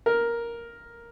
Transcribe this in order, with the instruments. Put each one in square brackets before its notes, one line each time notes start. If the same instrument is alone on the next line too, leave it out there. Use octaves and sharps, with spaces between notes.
[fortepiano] A#4